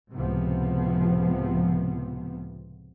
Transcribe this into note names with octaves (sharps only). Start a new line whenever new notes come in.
C#2 A2 C3 F3 B3